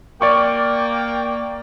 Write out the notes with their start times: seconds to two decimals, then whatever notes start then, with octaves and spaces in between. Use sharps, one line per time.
0.21 A#3 D5 G5 C#6 D6